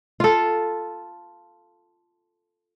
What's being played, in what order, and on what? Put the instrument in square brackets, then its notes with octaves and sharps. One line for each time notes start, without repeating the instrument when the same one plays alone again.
[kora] F4 A4